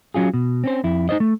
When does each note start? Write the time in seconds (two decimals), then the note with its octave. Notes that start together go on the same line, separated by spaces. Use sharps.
0.14 F#3 C#4 F4 G#4
0.34 B2
0.64 C4 C#4 C5
0.84 F2 E4
1.09 D#4 C5 D#5
1.20 A3